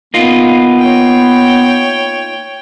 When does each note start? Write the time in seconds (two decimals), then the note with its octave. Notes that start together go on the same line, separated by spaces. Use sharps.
0.14 A#3 B3 D#4 F4
0.79 C#5 G5